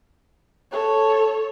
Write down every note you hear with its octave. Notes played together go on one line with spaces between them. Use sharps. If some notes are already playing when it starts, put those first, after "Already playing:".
A4 C#5